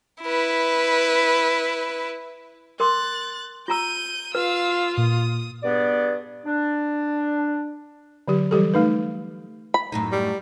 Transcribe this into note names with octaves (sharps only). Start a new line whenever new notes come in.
E4 B4
A#4 C6 D6 F#6 A6
F4 A#5 E6 G6 D#7
F4 B4 F5 E6
A#2 D#6
G2 B3 G#4 D5
D4
D3 F#3 G4
E3 G3 G4 A4
A3 D#4 B4
B5
F#2 A2 D#4
G3